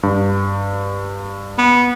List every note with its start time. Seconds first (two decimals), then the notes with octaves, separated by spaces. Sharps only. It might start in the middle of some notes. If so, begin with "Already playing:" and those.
0.03 G2
1.58 B3